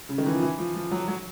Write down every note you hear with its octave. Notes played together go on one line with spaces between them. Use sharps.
C#3
D#3
E3
F3
E3
F3
F3
F#3
F#3